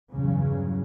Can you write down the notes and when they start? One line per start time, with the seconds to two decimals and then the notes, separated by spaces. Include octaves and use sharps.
0.12 E2 G2 C#3 F#3